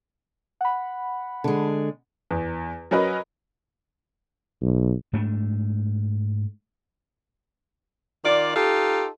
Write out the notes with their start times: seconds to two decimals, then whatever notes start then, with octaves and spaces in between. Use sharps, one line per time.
0.61 F#5 B5
1.44 D3 G#3
2.31 E2
2.91 F#3 C#4 A#4 B4 D#5
4.62 B1
5.13 G#2 A3 D4
8.24 D#3 F4 D5
8.56 D#4 F4 G4 A4